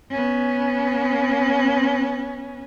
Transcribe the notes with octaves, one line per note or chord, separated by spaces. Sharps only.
B3 C#4